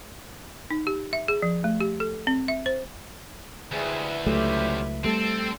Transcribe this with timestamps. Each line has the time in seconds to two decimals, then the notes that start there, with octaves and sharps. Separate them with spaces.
0.70 D#4
0.87 G4
1.13 E5
1.28 G#4
1.42 F3
1.64 A3
1.80 G4
2.00 A4
2.27 C4
2.48 E5
2.66 C5
3.72 D2 G3 G#3 E4 G#4 B4 E5
4.26 C#2 F#3 A3 C#4 F4 G4
5.04 G3 A3 C4 A4